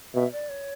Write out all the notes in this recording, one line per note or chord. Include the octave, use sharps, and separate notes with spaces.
B2 E5
D5
C#5